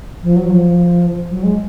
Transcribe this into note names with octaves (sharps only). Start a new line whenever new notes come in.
F3
F#3
F3
F#3
G#3